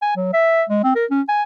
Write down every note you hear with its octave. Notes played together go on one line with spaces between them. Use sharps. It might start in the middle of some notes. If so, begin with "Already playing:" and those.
G#5
F#3
E5
G#3
C4
A#4
C#4
G#5